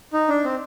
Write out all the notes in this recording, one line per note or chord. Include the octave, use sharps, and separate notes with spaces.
D#4
D4
C4